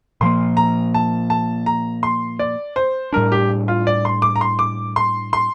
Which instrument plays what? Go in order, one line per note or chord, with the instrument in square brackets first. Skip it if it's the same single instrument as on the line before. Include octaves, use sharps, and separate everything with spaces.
[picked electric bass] A#2 F3 A#3 [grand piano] C6
[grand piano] A#5
A5
A5
A#5
C6
D5
C5
[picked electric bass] A2 G3 D4 [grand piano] A#4
[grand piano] G4
F4
D5
C6
D6
A#5
C6
D6
C6
C6